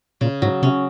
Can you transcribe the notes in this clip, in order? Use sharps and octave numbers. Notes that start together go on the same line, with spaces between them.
A#2 C#3
G#2 F#3
C3 C#4